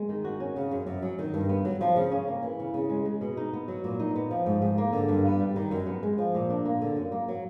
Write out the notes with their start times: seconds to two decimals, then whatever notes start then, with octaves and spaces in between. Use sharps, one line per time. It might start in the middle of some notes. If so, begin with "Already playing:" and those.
Already playing: G#3
0.09 D#3
0.24 F#4
0.40 C#4
0.56 C#3
0.71 F#2
0.87 F#2
1.03 F#3
1.19 D#3
1.34 G2
1.49 B3
1.65 F#3
1.81 F3
1.96 C#3
2.11 C#4
2.28 A#3
2.43 E3
2.60 C#3
2.74 C#3
2.90 G#3
3.05 G#3
3.21 B2
3.37 D#4
3.53 B3
3.68 F#3
3.84 A#2
3.99 D#4
4.15 B3
4.31 F3
4.46 G#2
4.62 G#2
4.78 A#3
4.93 D3
5.08 G2
5.25 B3
5.40 G3
5.56 D#3
5.71 F#2
5.87 B3
6.03 G#3
6.18 F3
6.34 A#2
6.50 D4
6.65 A#3
6.81 D3
6.97 F#2
7.12 A#3
7.28 F#3